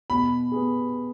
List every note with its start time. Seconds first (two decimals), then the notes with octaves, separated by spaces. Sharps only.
0.10 B2 B5
0.52 B3 G#4